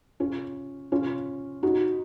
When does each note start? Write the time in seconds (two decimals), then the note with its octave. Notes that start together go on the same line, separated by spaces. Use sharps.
0.20 C#4 F4
0.92 C#4 F4
1.63 D#4 F#4